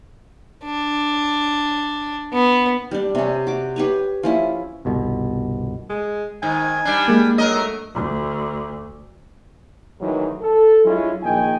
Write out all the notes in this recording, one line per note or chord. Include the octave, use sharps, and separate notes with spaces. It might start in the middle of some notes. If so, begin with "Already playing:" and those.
D4
B3
G3 D4
C3 C#4
F#4 D6
G4 B4 C#5
F3 C#4 E4
G1 C2 B2
G#3
G#2 D#3 G#5
G3 D4
G#3 A#3
F#3 A#4 D#5
A3
D2
A1 D2 G#2 D#3 E3 F#3
A4
F#3 G#3 C#4 D4 E4 F4
A#1 D#3 G#4 D#5 G5 G#5